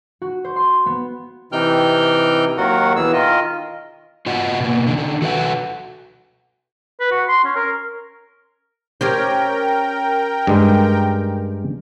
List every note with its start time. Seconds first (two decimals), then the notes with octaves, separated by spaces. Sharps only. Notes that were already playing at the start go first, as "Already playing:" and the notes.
0.22 F#4
0.44 C5
0.56 C6
0.86 B3
1.52 C3 E3 D#4 G5 F6 G6
2.57 D#2 D#3 F#3 F#4 A#4 F#5
2.96 B2 E3 G#4 E6
3.13 D#3 F4 A#4 D#5
4.26 F4 F#4 D#5 F#5
4.60 B2 A#3
4.87 D3 D#3
5.22 F#4 A4 B4 E5 F#5
7.00 B4
7.11 F#4
7.28 C6
7.44 C#4
7.56 A#4
9.01 C#4 G4 A#4 C5 G5
10.47 G2 G#3